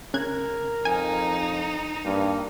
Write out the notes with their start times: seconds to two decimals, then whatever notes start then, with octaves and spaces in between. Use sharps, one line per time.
0.14 C#3 A#4 F#6 G#6
0.85 F2 D#4 G#5
2.05 G2 A#3